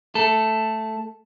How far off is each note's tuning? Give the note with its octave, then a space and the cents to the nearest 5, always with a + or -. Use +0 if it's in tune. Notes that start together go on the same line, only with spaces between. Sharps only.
A3 +0 A4 +0